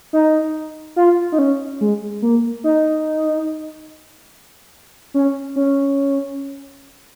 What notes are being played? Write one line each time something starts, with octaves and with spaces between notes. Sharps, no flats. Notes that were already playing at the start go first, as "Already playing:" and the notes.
D#4
F4
D#4
C#4
G#3
A#3
D#4
C#4
C#4